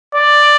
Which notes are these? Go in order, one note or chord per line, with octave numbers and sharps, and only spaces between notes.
D5